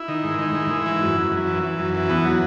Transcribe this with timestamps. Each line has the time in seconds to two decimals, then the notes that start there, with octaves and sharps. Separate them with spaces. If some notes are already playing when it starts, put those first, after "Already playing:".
Already playing: E4
0.08 D#3
0.24 G#2
0.39 D#3
0.55 G#2
0.70 G#2
0.86 E3
1.01 F#2
1.17 F#2
1.32 F#2
1.47 E3
1.63 E3
1.79 F#2
1.94 E3
2.10 E2 B3
2.25 F#3